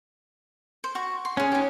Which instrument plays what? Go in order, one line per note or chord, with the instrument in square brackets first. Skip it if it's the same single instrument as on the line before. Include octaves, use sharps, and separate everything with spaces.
[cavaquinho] C5
F#4 C#6
C6
[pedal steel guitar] C#4 [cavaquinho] G#4 F#5
[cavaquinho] D#4 G4